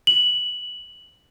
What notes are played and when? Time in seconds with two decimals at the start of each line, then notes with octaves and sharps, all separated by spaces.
0.07 F#7